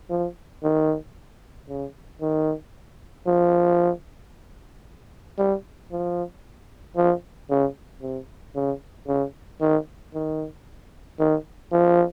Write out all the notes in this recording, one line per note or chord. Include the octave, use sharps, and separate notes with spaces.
F3
D#3
C#3
D#3
F3
G3
F3
F3
C#3
C3
C#3
C#3
D#3
D#3
D#3
F3